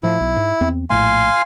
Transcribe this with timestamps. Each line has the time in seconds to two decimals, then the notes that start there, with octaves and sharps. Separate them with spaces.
0.03 A2 F3 E4
0.21 B1
0.36 G#2
0.61 E2 C4
0.90 A#1 A2 A3 F5 G#5 C6